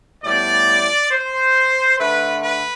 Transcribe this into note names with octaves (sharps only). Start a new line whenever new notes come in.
A2 G3 B3 D5
C5
D3 A3 B4
B4